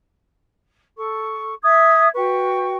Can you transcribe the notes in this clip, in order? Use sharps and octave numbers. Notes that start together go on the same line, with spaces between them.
A4 C#6
E5 D#6 G#6
F#4 B4 G5 C#6